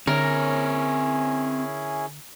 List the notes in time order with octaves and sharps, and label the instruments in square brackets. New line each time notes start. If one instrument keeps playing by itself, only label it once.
[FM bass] D3 [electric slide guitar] C4 C#5 [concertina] C#4 E4 G#4 [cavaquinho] A#4